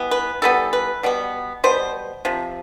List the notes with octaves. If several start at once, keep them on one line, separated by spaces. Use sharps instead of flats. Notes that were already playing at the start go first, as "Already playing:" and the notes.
Already playing: E3 G3 B3
B4
E3 G3 B3 A4
B4
B2 G3 B3
B2 G3 B3 C5
C3 F3